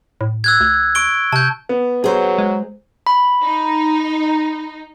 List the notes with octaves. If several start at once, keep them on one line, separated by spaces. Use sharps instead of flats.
A2
E6 F#6 G#6
D2
C#6 D7 G7
C3 A5 G6
B3
F#3 G#4 C5
G#3
B5
D#4